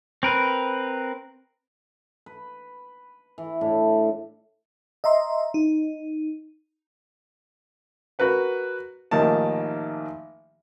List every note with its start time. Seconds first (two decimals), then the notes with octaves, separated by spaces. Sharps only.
0.23 C4 A#4 B4
2.26 B4
3.38 E3
3.61 A2 D4 E4
5.04 D#5 E5 A#5 C6
5.54 D#4
8.19 F#4 A#4 B4 F#5
9.11 A1 D#3 F3 A#3 D#4 A5